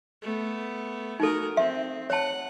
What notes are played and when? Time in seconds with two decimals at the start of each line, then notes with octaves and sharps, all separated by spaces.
0.22 A3 B3
1.20 D#4 F#4 A4 A#4
1.57 C4 E5
2.10 C#5 F#5 A5